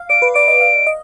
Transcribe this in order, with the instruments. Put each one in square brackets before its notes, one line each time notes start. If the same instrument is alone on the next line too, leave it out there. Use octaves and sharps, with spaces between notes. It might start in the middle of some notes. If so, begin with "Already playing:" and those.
Already playing: [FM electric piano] F5
[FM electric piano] D5 [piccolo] D7
[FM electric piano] B4
[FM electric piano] D5 [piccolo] D7
[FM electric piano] D#5
F5
D#5